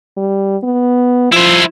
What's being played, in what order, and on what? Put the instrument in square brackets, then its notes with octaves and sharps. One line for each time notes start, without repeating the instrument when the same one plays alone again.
[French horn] G3
B3
[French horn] F3 [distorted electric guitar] E4 C5